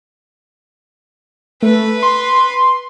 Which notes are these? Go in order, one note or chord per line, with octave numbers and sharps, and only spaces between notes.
A3 B4
C6